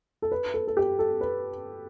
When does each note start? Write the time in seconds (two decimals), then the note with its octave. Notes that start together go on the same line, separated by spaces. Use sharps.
0.22 A4
0.32 B4
0.54 A4
0.67 A4
0.77 G4
0.99 A4
1.21 B4